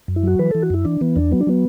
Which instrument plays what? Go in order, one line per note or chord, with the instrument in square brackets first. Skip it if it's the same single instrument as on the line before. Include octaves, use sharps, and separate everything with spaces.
[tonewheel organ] F#2
E4
F#3 F#4
E3 B4
E3 A4
F#4
F#2 E4
E3 D4
E3 B3
E2 D4
F#3 B3
D4
F#3 B3